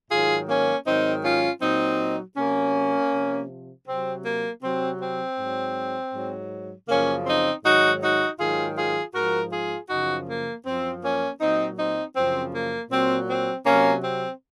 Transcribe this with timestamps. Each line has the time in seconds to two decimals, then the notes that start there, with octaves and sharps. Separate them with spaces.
0.11 G#2 D#3 F#3 F4 G#4
0.49 A#3 C#4
0.86 G#2 D#3 F#3 C4 D#4
1.24 C#4 F4
1.62 A#2 F#3 C4 D#4
2.37 C3 F#3 A#3 C#4
3.13 C3 F3
3.87 C3 F#3 C4
4.25 A#3
4.63 C3 F#3 C4
5.00 C4
5.38 G#2 F#3
6.13 G#2 F#3
6.88 F#2 C#3 F3 A#3 C#4
7.26 C4 D#4
7.64 G#2 D#3 F#3 D#4 F#4
8.02 D#4 F#4
8.39 G#2 D#3 F#3 F4 G#4
8.77 F4 G#4
9.14 G#2 F3 F#4 A#4
9.52 F4 G#4
9.90 F#2 C#3 F3 D#4 F#4
10.27 A#3
10.65 F#2 F3 C4
11.03 A#3 C#4
11.40 A#2 F#3 C4 D#4
11.78 C4 D#4
12.15 F#2 C#3 F3 C4
12.53 A#3
12.90 A#2 F#3 C4
13.29 C4
13.66 C3 F#3 A#3 C#4
14.04 C4